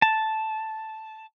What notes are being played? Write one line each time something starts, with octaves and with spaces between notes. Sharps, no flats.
A5